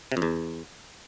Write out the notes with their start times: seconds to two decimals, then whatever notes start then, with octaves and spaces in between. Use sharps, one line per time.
0.12 C3
0.17 F2
0.22 E2